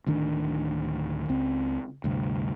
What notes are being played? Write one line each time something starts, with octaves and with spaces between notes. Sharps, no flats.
D1 D2 D#3 D4
C#2 C4
D2 G2 C3